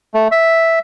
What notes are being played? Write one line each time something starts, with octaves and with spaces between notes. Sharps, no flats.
A3
E5